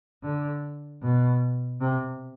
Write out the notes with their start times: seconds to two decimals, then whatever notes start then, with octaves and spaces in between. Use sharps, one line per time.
0.24 D3
1.03 B2
1.81 C3